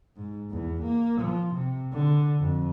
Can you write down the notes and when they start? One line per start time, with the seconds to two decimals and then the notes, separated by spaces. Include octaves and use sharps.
0.16 G#2
0.51 E2
0.83 A#3
1.21 F3
1.54 C3
1.93 D3
2.40 F2